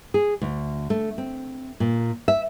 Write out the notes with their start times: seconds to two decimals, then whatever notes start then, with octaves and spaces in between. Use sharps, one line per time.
0.14 G#4
0.42 D2
0.90 A3
1.18 C4
1.80 A#2
2.28 E5